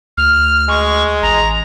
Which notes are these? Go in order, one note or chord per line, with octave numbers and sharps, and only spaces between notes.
D2 F6
G#3 C#6
A1 A#5